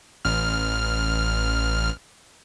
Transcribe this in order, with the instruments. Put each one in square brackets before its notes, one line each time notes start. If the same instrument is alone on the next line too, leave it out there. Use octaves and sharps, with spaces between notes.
[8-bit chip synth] A1 F6